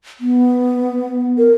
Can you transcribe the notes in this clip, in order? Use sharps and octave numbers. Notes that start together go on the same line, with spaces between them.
B3
A#4